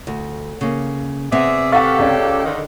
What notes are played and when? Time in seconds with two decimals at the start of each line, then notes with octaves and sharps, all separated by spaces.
0.07 D2
0.61 C#3 A#3
1.32 C3 B3 C4 G#4 D5 E5
1.72 G4 A4 F5 F#5 C#6 A6 B6
1.99 C#2 C#5 D5 F5
2.45 D3 D#3